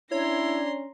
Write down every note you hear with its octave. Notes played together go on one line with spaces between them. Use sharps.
C#4 D4 E4 C#5 A#5 C6